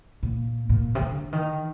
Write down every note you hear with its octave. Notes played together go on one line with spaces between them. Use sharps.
A#2
A#2
C3
D3
D#3